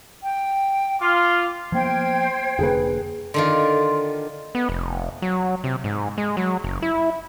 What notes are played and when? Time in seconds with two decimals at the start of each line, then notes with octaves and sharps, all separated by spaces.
0.23 G5
1.01 F4 D6
1.72 F3 A#3 B3 C5 G5 G#6
2.59 F1 D3 A#3 G#4 B4
3.34 D3 D#3 F4 C6
4.55 B3
4.69 F1
5.22 F#3
5.64 C3
5.84 G#2
6.18 G#3
6.37 F#3
6.64 F#1
6.82 E4